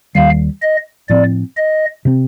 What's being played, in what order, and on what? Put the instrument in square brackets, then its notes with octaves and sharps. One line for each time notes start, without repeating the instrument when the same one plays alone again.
[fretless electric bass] D#2 D#3 G3 [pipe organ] F5
[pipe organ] D#5
[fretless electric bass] A2 F3 C4 [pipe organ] D5
[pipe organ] D#5
[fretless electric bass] C3 F3 C4